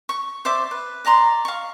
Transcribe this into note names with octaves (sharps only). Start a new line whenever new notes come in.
C#6
C5 D5 E5 D6
B4
D5 D#5 A#5 C6
F5 C#6